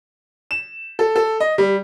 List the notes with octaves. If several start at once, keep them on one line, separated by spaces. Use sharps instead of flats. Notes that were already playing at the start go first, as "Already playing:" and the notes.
E7
A4
A4
D#5
G3